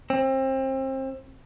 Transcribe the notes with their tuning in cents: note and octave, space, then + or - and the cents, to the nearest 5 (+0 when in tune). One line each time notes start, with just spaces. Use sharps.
C4 +30